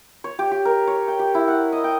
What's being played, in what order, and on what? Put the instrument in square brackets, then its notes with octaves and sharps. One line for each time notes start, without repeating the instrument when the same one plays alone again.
[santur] C#5
G4
G4
A#4
C#5
G5
G4
E4
F#5
D#5
G5